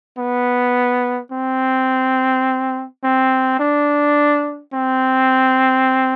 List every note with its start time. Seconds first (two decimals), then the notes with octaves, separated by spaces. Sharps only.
0.18 B3
1.32 C4
3.04 C4
3.60 D4
4.73 C4